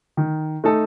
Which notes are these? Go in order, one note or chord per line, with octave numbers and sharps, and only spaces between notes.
D#3
A3 D#4 A4